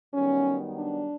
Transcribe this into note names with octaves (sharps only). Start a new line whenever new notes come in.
F#2 D#3 G3 B3 C#4
D4